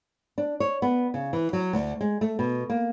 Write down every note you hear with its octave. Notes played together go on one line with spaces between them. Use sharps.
D4
C#5
B3
C#3
E3
F#3
D2
G#3
A3
B2
A#3